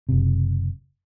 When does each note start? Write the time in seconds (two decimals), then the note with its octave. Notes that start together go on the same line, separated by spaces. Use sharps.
0.09 F#1 C3